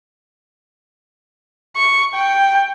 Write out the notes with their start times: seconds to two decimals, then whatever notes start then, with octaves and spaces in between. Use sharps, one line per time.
1.76 C#6
2.14 G5